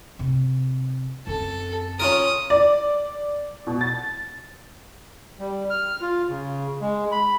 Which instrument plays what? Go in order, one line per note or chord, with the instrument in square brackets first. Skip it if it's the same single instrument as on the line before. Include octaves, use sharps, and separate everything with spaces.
[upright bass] C3
[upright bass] F#2 C4 [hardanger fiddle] A4
[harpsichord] C#4 F4 A#4 [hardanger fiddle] D#6
[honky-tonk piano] D5
B2
A6
[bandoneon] G3
F6
F4
C#3
G#3
B5